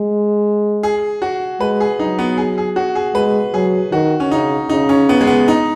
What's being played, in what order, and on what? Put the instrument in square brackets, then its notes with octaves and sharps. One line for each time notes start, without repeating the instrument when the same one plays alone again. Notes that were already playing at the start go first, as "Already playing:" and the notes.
Already playing: [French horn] G#3
[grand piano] G#4
F#4
[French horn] G#3 [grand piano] B4
[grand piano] G#4
[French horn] F#3 [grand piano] D#4
[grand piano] B3
G#4
G#4
F#4
G#4
[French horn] G#3 [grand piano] B4
[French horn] F#3 [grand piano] G#4
[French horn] D#3 [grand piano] F#4
[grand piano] C#4
[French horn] C#3 [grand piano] D#4
[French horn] C#3 [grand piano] D#4
[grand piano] C#4
B3
G#3
B3
D#4